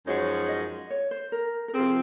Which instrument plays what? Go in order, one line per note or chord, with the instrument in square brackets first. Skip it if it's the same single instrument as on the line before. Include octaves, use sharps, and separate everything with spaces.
[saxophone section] F#2 F3 G#3 D#4 F#4 [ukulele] C#5
[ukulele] D#5
C#5
C5
A#4
A#4
[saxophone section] C3 F3 C4 [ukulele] G#4